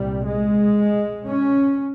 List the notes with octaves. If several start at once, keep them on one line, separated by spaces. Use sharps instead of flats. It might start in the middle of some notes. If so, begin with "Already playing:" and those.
Already playing: C2 A#2 G3
G#3
C#4